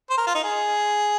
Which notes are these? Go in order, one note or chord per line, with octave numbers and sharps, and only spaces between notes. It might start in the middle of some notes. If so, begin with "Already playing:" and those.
C5
A#4
F4
D#4
G#4